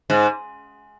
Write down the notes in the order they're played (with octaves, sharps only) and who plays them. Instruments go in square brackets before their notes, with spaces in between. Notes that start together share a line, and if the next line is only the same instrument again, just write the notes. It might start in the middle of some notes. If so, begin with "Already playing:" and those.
[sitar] G#2